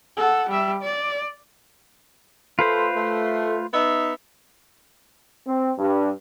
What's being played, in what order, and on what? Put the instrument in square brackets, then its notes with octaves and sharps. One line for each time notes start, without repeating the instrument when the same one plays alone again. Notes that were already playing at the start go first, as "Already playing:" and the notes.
[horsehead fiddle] A4 F#5
G3 E5
D5
[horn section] A3 [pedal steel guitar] F4 B4 C5
[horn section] A3
B3 D#4 E5
[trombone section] C4
G2